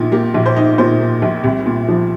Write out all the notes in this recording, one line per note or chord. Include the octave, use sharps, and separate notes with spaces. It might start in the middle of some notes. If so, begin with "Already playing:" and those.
Already playing: A#1 A#2 D#4
A#3 G4
A#1
C5
D#4
A#2 C5
A#3
A#1
C2
A#2
F3